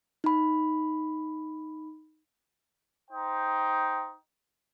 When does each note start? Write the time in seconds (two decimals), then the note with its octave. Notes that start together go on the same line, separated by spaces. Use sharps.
0.24 D#4 B5
3.11 D#4 C5 G5